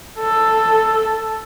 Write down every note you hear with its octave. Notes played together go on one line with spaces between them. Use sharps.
A4